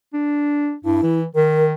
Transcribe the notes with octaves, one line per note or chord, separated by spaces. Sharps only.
D4
G2 E4
E3
D#3 A#4